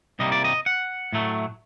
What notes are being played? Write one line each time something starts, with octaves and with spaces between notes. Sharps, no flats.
C2 C3 G3 A#3 D#5
D5
D#5
F#5
A2 F#3 A3